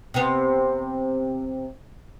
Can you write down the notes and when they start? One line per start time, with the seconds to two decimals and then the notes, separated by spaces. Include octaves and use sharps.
0.14 C3 B3